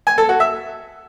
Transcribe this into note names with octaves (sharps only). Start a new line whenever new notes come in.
G#5
A4
F#4
E5